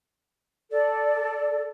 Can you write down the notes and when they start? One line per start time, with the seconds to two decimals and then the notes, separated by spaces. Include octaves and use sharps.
0.71 A4 D5